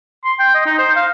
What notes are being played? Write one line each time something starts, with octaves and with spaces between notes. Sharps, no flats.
C6
G5
D#5
D#4
C5
F5